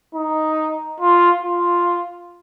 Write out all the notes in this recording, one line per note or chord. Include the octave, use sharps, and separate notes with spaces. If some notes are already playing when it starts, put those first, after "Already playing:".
D#4
F4
F4